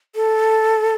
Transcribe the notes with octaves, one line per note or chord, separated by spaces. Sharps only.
A4